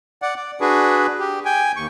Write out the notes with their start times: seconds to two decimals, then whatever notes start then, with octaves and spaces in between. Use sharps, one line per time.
0.22 D5 F#5
0.36 D5
0.60 D4 F#4 G#4 B4
1.19 G4
1.45 G5 G#5
1.76 D#2 C#6